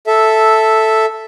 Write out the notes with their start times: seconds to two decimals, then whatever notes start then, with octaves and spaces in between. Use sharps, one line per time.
0.07 A4 E5